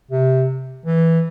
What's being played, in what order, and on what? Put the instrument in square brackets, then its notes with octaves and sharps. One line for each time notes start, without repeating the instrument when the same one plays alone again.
[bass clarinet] C3
E3